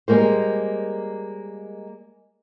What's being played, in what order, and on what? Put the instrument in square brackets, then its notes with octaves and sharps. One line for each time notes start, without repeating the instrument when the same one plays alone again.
[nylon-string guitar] G3 G#3 A#3 A#4 C5